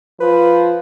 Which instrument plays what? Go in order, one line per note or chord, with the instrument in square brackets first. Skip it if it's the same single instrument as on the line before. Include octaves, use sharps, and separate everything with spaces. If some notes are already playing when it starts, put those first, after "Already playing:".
[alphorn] F3 [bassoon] B4